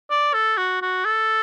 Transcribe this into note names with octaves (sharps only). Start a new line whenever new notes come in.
D5
A4
F#4
F#4
A4